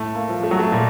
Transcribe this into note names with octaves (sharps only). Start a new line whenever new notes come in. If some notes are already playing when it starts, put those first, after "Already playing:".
Already playing: A2 A3
A#3
F3
A3
F#3
A3
A#2